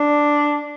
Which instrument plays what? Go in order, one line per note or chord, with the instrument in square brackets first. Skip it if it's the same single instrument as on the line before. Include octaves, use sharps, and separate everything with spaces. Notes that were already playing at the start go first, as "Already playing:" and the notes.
Already playing: [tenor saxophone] D4